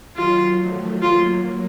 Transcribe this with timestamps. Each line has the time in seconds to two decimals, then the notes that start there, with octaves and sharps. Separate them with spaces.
0.16 D#3 F#3 F4
0.59 F3 A3
1.02 F#3 A#3 F4